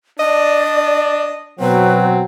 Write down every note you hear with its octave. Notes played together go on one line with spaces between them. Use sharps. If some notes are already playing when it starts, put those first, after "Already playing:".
D4 D5 D#5
B2 F#3 C4 B4